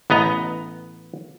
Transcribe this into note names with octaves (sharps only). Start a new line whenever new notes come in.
A1 B3 D#5 A#5